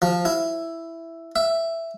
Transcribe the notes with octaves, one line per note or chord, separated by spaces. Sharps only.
F3
E4
E5